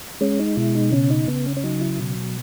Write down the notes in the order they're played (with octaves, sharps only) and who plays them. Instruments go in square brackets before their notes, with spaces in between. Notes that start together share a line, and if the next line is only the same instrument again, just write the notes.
[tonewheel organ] G#3 C#4
D#4
B2 E4
D#4
C#3 C#4
D#4
C#3 B3
C#4
C#4
F#3 D#4
E4
B2